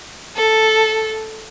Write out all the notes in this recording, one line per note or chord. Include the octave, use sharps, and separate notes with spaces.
A4